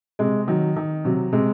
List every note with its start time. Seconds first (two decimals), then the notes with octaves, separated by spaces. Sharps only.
0.19 C3 G#3
0.48 D#3 F#3
0.76 D#3
1.05 C3 F#3
1.33 C3 G#3